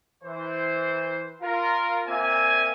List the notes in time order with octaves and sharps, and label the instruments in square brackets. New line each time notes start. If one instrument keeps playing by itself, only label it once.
[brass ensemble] E3 C5
F4 A#4
A#2 A#3 C4 E5 G#5